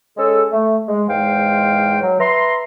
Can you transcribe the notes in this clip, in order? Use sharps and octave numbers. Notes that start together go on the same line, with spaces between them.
G#3 C#4 G#4 A4
A3
G#3
E2 G#2 G#3 C5 F5 G5
F#3
B4 E5 A#5 C6